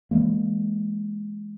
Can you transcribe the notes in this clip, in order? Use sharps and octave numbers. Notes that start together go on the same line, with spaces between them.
E3 F#3 G#3 A#3